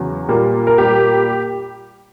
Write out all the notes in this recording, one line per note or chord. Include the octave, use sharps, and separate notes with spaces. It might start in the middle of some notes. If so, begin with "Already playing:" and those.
Already playing: E2 C#3 F#3
A#2 G3 A#3
A#4
A#2 G3 A#3 G4